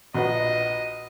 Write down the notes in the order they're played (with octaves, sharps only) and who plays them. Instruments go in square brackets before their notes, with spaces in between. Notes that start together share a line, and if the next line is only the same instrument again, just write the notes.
[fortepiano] A#1 F#4 B4 [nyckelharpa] D#5